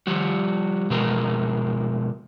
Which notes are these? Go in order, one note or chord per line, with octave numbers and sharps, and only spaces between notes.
F3 G3 F#4
B2 F3 G#3 A#4